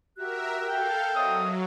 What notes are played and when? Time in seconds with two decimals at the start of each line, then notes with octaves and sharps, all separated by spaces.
0.17 F#4 G4 A#4 E5 F#6
0.69 A4 F5 G5
1.15 F#3 C4 C#5 D#5 E5 D#6